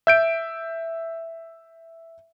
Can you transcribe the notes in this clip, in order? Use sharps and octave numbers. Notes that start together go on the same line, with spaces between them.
E5 G6 D7